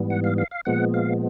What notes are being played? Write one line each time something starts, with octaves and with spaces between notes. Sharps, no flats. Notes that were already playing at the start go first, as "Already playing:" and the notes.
Already playing: G#2 E3 G3 B3
F#5
F5
F5
F5
A#2 F3 G#3 B3 F#5
F5